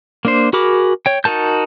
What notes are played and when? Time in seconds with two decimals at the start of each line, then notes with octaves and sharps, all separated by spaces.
0.25 A#3 D4 C5
0.53 F#4 G#4 A#4 B5 D6
1.06 C#5 G5
1.24 D#4 F#4 A#4 A5 G6